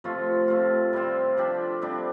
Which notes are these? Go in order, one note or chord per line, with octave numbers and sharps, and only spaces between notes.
C3 F3 A3 F4
C3 A3 F4
C3 G3 C4 F4
F3 D4 G4
C3 G3 D4